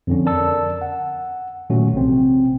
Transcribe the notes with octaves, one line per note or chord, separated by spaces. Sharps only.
F2 D3 C#4
A#4 D5 A5 E6
F#5
A#2 D#3 F#3 A3 C#4 F#4
A#1 C3 C4